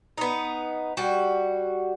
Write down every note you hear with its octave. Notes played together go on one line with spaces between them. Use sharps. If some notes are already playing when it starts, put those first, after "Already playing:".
B3 D#4
G3 F#4